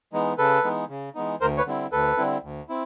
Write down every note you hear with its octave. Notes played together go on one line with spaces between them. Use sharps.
E3 G#3 B3 D#4
C#3 A4 B4
E3 G#3 B3 D#4
C#3
E3 G#3 B3 D#4
D2 A#4 C5
B4 C#5
D3 G3 C4 E4
D2 A4 B4
D3 G3 C4 E4
D2
C4 E4